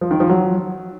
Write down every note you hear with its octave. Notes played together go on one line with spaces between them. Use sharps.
F3
D#3
F3
F#3